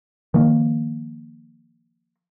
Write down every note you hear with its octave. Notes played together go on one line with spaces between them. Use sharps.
D#3 F3 A#3